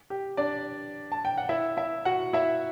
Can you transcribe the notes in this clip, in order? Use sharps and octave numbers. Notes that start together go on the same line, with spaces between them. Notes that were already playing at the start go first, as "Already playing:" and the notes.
G4
D4 D5
A5
G5
F#5
E4 E5
E4 E5
F#4 F#5
E4 E5